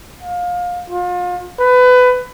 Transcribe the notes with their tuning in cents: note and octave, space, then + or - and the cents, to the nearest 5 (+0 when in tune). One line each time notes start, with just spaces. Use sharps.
F5 +25
F4 +35
B4 +20